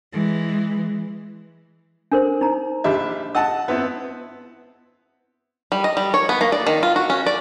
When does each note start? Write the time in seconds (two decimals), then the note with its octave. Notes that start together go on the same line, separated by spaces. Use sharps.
0.13 E3 G#3
2.12 D4 A#4 C5
2.41 D#4 A#5
2.84 A#1 G4 D#5 E5 B5
3.35 D#5 F#5 A5 E6
3.68 B3 C4 E4
5.72 G3
5.84 D#5
5.97 G3
6.14 C#5
6.29 B3
6.41 A#3
6.52 D5
6.67 D#3
6.83 F4
6.96 F#4
7.10 C#4
7.27 D5